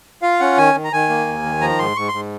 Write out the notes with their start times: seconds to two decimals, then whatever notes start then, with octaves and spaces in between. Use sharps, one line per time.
0.22 F4 F5
0.40 C#4 F#5
0.58 D#3 G#5
0.75 D#3
0.84 A#5
0.93 D#3 G#5
1.09 A#3
1.27 D#2
1.44 D#3
1.61 F3 A#5
1.79 G#2 C6
1.96 G#2 C#6
2.08 G#2 C6